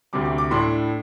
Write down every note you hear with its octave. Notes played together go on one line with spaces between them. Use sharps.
D2 C3 G3 D6
D6
D6
A2 A3 D4 C6